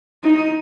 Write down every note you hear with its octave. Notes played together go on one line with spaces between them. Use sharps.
D#4